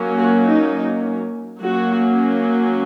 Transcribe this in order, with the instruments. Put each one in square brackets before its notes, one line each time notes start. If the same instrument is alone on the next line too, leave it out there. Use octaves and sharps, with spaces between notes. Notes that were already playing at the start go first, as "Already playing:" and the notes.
Already playing: [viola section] F#3 A#3 C#4
F#4
D#4
F#3 A#3 C#4 F#4